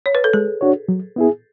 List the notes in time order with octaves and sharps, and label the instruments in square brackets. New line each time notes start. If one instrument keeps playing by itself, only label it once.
[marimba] C#5
B4
A4
[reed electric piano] G#3 [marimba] G#4
[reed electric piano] D4 F#4 C#5
F#3
B3 E4 G#4